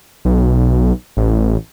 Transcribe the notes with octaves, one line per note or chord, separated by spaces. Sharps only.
B1
A1